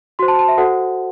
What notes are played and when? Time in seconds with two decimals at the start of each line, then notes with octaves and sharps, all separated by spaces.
0.19 F#4 C5 C6
0.28 A5
0.39 A5
0.49 E5
0.58 F#4 A4 C5 F#5